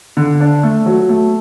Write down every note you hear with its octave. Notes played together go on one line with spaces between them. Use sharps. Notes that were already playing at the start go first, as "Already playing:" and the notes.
D3
D4
A3
F#3
A3